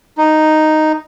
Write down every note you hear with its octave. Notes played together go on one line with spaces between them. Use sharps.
D#4